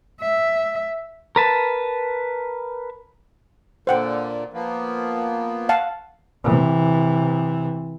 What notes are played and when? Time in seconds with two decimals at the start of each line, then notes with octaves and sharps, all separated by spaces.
0.21 E5
1.36 A#4 B4 A5
3.87 A#2 D3 C5 F#5 G5
4.53 F3 A#3 B3
5.69 F5 F#5 A5
6.44 C3 E3